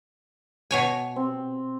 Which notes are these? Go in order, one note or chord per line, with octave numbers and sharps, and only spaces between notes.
B2 C#5 G#5
C4